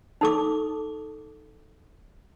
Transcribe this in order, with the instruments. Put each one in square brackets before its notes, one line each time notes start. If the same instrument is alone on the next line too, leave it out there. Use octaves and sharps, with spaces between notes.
[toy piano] D#4 A4 D6